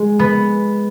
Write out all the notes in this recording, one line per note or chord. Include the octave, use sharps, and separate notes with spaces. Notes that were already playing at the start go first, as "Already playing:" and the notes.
Already playing: G#3
B3